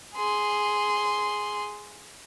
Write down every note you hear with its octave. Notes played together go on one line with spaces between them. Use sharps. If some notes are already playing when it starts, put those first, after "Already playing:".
G#4 C6